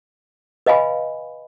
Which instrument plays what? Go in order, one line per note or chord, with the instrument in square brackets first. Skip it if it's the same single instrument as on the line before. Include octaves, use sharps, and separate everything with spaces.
[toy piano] B4 D#5 F5 G#5 B5